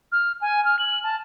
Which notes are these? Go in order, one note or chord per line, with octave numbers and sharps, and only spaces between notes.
F6
G#5
F6
F#7
A5